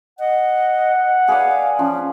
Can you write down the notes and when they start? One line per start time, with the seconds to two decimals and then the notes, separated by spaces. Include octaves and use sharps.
0.19 D#5 F#5
1.28 G#4 B4 D5 F5
1.79 F3 C#4